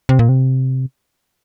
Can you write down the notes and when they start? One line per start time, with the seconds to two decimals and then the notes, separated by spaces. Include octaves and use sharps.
0.09 C3
0.19 A#2
0.29 C3